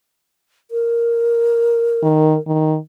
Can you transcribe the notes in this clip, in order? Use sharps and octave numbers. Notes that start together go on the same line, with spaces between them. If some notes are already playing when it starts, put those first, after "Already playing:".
A#4
D#3
D#3